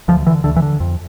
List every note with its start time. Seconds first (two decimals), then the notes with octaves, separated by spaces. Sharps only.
0.08 D2 F3
0.27 D3 E3
0.44 D2 D3
0.56 E3
0.62 D3
0.80 F2